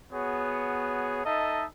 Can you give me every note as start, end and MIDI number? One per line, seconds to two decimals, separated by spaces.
0.13 1.23 59
0.13 1.23 66
0.13 1.23 68
0.13 1.23 73
1.24 1.65 63
1.24 1.65 69
1.24 1.65 75
1.24 1.65 76
1.24 1.65 81